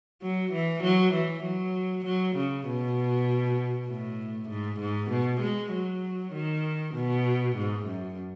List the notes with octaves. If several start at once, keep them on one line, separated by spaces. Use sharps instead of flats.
F#3
E3
F#3
E3
F#3
F#3
C#3
B2
A2
G#2
G#2
B2
G#3
F#3
D#3
B2
G#2
F#2